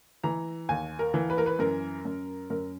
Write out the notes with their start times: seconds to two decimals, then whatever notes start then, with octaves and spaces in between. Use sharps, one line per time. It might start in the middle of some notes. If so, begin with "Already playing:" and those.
0.24 E3 A#5
0.69 D#2 G#5
0.99 A#4
1.14 E3
1.30 B4
1.38 A#4
1.46 B4
1.59 F#2 A#4
2.05 F#2
2.50 F#2 A#4